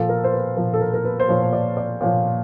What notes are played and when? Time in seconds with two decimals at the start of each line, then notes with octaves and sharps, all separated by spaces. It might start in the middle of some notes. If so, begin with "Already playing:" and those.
Already playing: A#2 F3 A4
0.09 A#4
0.24 C5
0.33 B4
0.56 A#2 F3 A#4
0.74 A4
0.81 A#4
0.94 A#4
1.05 B4
1.20 C5
1.29 A#2 F3 C#5
1.43 C#5
1.53 D5
1.77 D5
2.01 A#2 F3 C#5